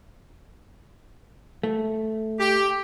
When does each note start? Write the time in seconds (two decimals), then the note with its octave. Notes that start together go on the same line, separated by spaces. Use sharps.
1.63 A3
2.40 G4